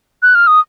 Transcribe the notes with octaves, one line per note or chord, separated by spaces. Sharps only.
F#6
F6
D#6